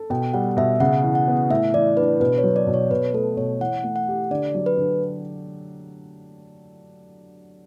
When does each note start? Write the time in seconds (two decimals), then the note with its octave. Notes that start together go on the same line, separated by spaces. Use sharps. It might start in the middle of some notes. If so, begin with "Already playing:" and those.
Already playing: A4
0.10 B2 G5
0.33 G3 F#5
0.57 B2 E5
0.80 C#3 F#5
1.03 E3
1.15 F#5
1.28 B3
1.50 A2 E5
1.74 E3 D5
1.97 D4 B4
2.20 B2 B4
2.38 C#5
2.44 F#3
2.56 D5
2.67 B2
2.74 C#5
2.91 B2 B4
3.14 A3 A4
3.37 B2 C#5
3.60 E3 F#5
3.84 A3
3.96 F#5
4.08 G4
4.31 D3 D5
4.55 F#3
4.66 B4
4.77 D3